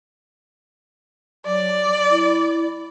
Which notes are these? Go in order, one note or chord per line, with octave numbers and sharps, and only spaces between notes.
F#3 D5
E4